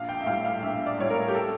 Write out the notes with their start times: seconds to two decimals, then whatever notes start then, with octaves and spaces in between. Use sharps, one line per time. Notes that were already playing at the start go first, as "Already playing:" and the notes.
Already playing: A#1 F5
0.09 G5
0.21 E5
0.26 A2 G3 F5
0.45 F5
0.63 A#1 E5
0.86 D5
0.98 A2 G3 C#5
1.10 A#4
1.28 G4
1.34 A4